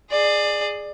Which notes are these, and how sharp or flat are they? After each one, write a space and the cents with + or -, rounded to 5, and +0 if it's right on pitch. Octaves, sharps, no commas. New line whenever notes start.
G#4 +0 D5 +25